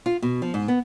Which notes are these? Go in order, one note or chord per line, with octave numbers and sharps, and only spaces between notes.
F4
B2
F3
G#2
B3